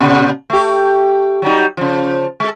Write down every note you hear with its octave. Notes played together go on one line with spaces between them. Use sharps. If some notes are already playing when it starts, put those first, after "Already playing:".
A#2 C#3
A3 G4
F#3 G3 D#4
C#3 F3
G#3 A4